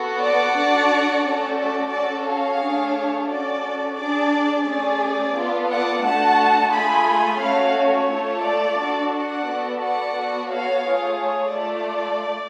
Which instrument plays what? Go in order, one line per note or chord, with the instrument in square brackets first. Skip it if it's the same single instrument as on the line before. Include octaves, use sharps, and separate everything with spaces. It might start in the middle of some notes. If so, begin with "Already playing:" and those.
Already playing: [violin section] B3 F#4 A4
D5 F#5
D4 F#4 A4
A3 C#4 F#4 A4
D5
C#4 F#4 A4 D5
C#5 F5
A3 D4 G#4
C#4 F#4 A4 D5
D4 G#4 D5
A3 C#4 G#4 D5
B3 F4 A4
D5 F#5
A3 D4 F#4 A4 F#5 A5
A3 F4 G#4 G#5 B5
A3 C#4 F#4 C#5 F5
C#5
A3 F4 A4
D5
D4 F#4 A4
D5 F#5
B3 F#4 A4
D5 F#5
B3 F#4 A4
C#5 F5
A3 F4 G#4
C#5
A3 F4 A4 D5